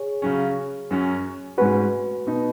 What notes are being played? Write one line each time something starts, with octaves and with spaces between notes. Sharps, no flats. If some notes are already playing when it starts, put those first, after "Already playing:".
Already playing: G#4 C#5
C#3 F#3 C#4
F#2 F#3 C#4
G#2 G#3 C#4 F#4 B4
B2 B3 D#4